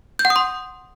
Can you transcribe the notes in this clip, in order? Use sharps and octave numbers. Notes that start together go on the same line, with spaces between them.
G6
F#5
D#6
C6